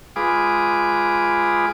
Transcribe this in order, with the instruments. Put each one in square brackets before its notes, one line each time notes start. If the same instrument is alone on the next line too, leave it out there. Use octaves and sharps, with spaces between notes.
[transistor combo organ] G#3 F4 G#4 B4 D6 D#6